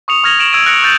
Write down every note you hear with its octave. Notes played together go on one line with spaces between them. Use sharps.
C#6 D#6 C#7 F7
C#6 F6 G#6 A#6 F7 F#7
F6 D7 E7 F#7
E6 G#6 A#6 D7 D#7
F#6 A#6 C#7 D7
C#6 E6 G6 A6 D#7 F#7